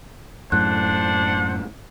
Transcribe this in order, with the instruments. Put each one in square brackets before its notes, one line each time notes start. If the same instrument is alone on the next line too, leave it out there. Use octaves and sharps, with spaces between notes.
[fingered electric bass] F#2 A2 [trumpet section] D4 C5 F#5 [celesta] F#6